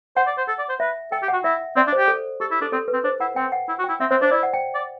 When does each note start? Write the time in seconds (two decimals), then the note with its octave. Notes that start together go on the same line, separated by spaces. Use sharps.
0.17 C5 F#5
0.27 D5
0.38 C5
0.48 A4
0.59 D5
0.69 C5
0.80 B4 E5
1.12 A4 G5
1.23 G4
1.28 F#4 F#5
1.44 E4 E5
1.76 C4 D5
1.87 D4
1.92 C5
1.98 G4
2.08 A4
2.40 G4 A4
2.51 E4
2.62 D4 A4
2.72 C4 A4
2.88 B4
2.93 C4
3.04 D4 C5
3.20 E4 F#5
3.36 C4 G5
3.52 F#5
3.68 E4
3.79 F#4
3.84 G5
3.89 E4
4.00 C4 E5
4.11 C4 C5
4.22 D4 C5
4.31 E4 D5
4.43 F#5
4.53 G5
4.75 D5